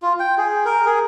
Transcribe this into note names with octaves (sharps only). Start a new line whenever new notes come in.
F4
G5
G#4
A#4
G#4